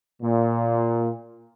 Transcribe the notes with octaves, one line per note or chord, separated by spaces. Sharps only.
A#2